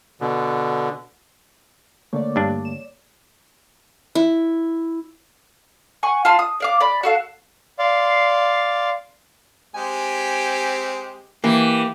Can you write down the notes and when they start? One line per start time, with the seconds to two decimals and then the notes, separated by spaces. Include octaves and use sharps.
0.21 B2 D3
2.13 D3 A3 A#3 C#5 D5
2.36 G2 D4
2.65 E7
4.15 E4
6.03 F#5 G#5 C#6
6.25 F4 A5 C6
6.39 D#6
6.60 D5 F5 D6
6.80 D5 B5
7.03 F#4 A4 F5
7.79 D5 F5 C6
9.75 G#3 C4 G4 G#5
11.44 E3 A#3 G4